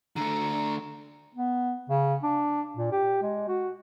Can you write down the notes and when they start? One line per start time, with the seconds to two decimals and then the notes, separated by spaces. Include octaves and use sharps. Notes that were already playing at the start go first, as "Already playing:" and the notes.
0.16 D3 A3 A#5
1.35 B3
1.90 C#3
2.23 D4
2.77 A#2
2.92 G4
3.22 G#3
3.48 F#4